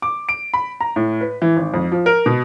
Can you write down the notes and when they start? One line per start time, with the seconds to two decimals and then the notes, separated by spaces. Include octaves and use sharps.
0.02 D6
0.29 D7
0.54 B5
0.81 A#5
0.96 A2
1.21 B4
1.42 E3
1.57 G#1
1.74 F2
1.92 F3
2.06 A#4
2.26 B2